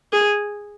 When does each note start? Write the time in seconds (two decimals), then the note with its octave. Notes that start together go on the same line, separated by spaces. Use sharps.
0.13 G#4